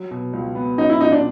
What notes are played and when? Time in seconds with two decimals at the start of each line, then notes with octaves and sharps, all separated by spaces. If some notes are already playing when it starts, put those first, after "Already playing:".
Already playing: F#3
0.11 B2
0.33 C#2
0.55 B3
0.78 F#3 D#4
0.90 E4
1.00 A#2 D#4
1.12 D4